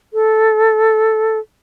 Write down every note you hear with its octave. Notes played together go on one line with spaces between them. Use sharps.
A4